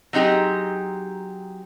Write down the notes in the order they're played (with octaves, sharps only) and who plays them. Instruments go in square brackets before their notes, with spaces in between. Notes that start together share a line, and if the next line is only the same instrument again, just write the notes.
[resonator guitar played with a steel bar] F#3 C4 D#4 G4 G#4